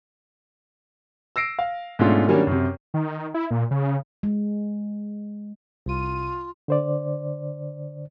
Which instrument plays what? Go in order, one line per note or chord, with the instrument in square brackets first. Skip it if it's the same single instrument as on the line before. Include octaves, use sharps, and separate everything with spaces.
[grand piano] E6 A#6 C7 D7
F5
G#2 B2 A3 C#4 D4 F4
D#3 F#3 G3 A#3 C#4 D4
F#2 C3
[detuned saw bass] D#3
E4
A#2
C#3
[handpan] G#3
[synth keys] C2 D#7 [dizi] F4
[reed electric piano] D3 C5 D5